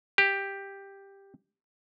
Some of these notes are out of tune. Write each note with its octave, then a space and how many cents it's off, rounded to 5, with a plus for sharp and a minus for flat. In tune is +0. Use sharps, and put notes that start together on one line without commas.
G4 +5